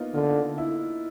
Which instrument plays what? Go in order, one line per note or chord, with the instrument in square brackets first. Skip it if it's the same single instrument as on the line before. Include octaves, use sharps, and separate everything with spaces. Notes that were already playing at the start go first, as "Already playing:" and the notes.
Already playing: [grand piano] A#3 B3 D#4 F4
[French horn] D3 [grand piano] F4
[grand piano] E4